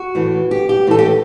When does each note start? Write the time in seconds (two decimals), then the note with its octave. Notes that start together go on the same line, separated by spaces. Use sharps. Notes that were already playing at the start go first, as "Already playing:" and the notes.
Already playing: F#4
0.15 A2 E3
0.51 G4
0.69 G4
0.87 A2 E3 A4
0.99 G4